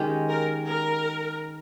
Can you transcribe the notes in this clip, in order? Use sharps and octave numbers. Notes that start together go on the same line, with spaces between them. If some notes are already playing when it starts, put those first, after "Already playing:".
Already playing: D#3 G#3 C#4 G4
A#4
A#4